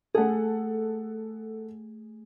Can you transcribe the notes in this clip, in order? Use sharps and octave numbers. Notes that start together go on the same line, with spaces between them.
A3 G#4 A4 F#5